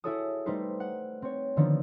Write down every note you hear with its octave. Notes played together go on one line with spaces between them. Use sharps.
E4 F#4 G#4 A4 C#5 D#6
G3 A3 D#4 B4 C5
F#5
C4 C#5
D3 D#3 F3 B3 D4 D#4